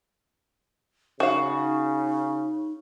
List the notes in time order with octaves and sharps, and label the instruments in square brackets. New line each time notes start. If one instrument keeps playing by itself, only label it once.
[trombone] C#3 [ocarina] D#4 [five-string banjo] F#4 F5